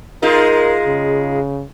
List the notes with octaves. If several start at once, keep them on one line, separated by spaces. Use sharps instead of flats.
G#3 D#4 F4 A#4
C#3